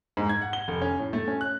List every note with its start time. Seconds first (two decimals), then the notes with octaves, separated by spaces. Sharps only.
0.17 G#2
0.29 G#6
0.42 F#5
0.53 G7
0.68 F1
0.82 C#4
0.99 A2
1.13 A3
1.28 C#4
1.41 F#6